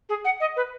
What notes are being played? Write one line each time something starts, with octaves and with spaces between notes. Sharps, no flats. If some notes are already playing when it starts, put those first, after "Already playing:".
G#4
F#5
D#5
B4